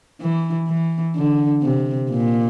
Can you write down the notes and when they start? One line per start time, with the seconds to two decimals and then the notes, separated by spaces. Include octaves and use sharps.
0.21 E3
0.68 E3
1.16 D3
1.62 C3
2.10 A#2